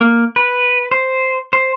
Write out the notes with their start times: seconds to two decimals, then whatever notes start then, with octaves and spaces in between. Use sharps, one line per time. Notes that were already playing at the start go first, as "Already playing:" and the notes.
0.01 A#3
0.36 B4
0.91 C5
1.53 C5